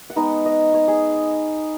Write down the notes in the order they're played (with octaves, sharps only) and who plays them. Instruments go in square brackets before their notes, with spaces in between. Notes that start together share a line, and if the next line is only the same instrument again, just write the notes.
[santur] F#5
G#3 B3 D#4 D#5
D#5
C#5
G#4